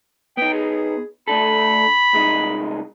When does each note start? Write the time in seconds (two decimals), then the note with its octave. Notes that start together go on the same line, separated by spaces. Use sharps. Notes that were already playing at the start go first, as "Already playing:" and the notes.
0.37 B3 D#4 G5
0.54 G#4
1.28 A3 D4 A4 B5
2.13 C2 G#3 D#4